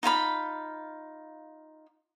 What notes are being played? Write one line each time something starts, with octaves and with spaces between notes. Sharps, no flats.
D#4 F4 F5 B5